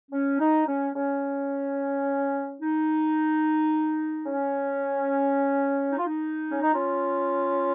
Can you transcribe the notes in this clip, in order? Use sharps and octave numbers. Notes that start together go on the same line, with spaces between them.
C#4
D#4
C#4
C#4
D#4
C#4
D#4
F4
D#4
C#4
D#4
C#4 F4